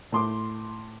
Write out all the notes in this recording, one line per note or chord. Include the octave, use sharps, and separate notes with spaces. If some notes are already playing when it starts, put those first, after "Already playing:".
A2 C6 D6